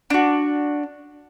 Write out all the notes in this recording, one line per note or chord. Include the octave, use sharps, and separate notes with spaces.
D4 F#4